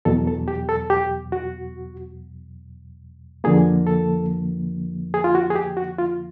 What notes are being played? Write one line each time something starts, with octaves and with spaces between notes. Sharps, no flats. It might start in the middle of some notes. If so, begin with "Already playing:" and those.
E2 B2 F#3 A4
A4
G4
A4
G4
F#4
F2 D3 F3 A#3 G#4
A4
G#4
F4
F#4
G#4
G4
F#4
F4